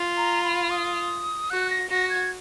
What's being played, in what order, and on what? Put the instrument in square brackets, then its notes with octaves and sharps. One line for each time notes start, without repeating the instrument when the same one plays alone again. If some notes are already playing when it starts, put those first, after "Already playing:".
Already playing: [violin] F4
[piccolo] A#5
B5
D#6
[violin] F#4 [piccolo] F#6
[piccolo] A#6
[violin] F#4 [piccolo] A#6
[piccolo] G#6